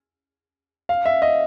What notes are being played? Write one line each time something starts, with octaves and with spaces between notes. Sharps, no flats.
F5
E5
D#5